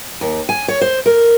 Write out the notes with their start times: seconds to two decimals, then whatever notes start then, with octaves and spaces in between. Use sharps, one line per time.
0.21 D#2
0.49 G#5
0.68 C#5
0.81 C5
1.06 A#4